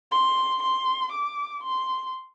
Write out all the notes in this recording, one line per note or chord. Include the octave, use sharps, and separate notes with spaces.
C6
C6
D6
C6